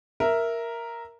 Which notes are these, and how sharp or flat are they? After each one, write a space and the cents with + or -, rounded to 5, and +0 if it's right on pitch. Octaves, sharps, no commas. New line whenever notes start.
A#4 +0 E5 +0